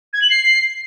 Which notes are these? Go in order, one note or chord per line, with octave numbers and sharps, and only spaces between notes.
G#6
F#7
C7